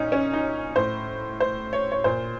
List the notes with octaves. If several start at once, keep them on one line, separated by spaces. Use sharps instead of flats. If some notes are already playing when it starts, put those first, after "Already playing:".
Already playing: A#2 C#4 D#4
C#4
D#4
A2 C5
C5
C#5
C#5
A#2 C5